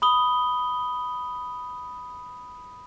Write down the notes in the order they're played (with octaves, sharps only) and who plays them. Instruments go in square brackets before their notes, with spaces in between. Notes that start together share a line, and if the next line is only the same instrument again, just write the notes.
[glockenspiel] B5 D#6 G7